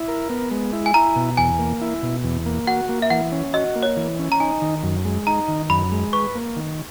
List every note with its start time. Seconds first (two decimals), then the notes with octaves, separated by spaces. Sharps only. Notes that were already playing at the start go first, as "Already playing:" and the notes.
Already playing: E4
0.08 A#4
0.30 B3
0.51 G#3
0.73 E4
0.86 G#5
0.94 E4 A#5
1.16 B2
1.37 E2 G#5
1.59 A#3
1.81 E4
2.03 B2
2.24 E2
2.46 A#3
2.67 F#4 F#5
2.89 A#3
3.02 E5
3.10 E3 F#5
3.32 C#4
3.53 F#4 D#5
3.76 A#3
3.83 C#5
3.97 E3
4.19 C#4
4.32 A#5
4.40 D#4 G#5
4.62 D#3
4.83 F#2
5.05 G#3
5.27 D#4 A#5
5.48 D#3
5.69 F#2 B5
5.92 G#3
6.13 B4 C#6
6.35 A#3
6.56 D#3